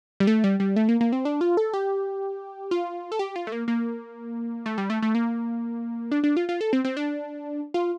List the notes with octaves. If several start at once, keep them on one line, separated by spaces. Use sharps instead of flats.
G3
A3
G3
G3
A3
A#3
A#3
C4
D4
F4
A4
G4
F4
A4
G4
F4
A3
A#3
A#3
A3
G3
A3
A3
A#3
D4
D4
F4
F4
A4
C4
C4
D4
F4